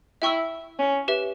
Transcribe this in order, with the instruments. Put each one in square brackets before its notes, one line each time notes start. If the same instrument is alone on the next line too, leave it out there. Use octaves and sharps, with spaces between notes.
[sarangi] E4 [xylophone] E5 G5 C#6 E6
[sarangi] C#4
[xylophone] G4 B4 E5